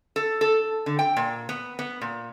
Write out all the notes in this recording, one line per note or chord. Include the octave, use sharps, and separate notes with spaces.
A4
A4
D3
G5
A#2
B3
B3
A#2